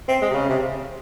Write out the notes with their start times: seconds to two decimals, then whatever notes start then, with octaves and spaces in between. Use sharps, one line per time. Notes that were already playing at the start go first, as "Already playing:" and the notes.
0.08 C4
0.22 G#3
0.30 C3
0.35 C#3
0.49 C3